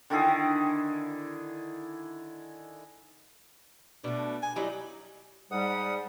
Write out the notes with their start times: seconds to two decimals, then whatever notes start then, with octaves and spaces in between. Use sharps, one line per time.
0.10 D3 D#3 E4 G#4
4.04 B2 A3 D4
4.42 G#5
4.56 F#3 G3 D#4 E4
5.51 G#2 G3 F#5 D#6